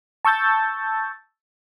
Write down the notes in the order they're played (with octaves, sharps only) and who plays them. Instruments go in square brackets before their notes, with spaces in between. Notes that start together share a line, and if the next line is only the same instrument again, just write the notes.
[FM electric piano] A5 C#6 E6 G6 A6